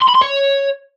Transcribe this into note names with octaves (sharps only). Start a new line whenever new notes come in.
C6
B5
C6
C#5